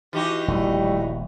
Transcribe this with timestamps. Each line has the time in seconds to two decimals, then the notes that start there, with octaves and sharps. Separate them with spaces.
0.13 E3 D#4 F#4 G4
0.48 D#1 A#1 A2 G3 A3